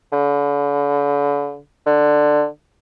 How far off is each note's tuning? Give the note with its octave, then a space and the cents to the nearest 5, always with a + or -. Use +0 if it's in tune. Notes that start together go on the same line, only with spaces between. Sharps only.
D3 -40
D3 +15